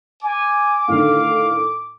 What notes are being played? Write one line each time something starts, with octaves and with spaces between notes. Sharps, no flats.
G#5 D6
A2 D3 D#3 F5